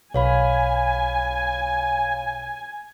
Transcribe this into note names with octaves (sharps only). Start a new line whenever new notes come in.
B1 C#5 F5 G#5 B5